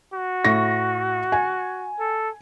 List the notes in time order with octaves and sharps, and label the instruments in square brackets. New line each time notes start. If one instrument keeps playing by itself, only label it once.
[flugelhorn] F#4
[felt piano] A2 C#6 A#6
G#5
[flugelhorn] A4